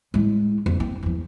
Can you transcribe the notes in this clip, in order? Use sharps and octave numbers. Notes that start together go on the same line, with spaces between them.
A2 G#3
F2
C4
E2 F3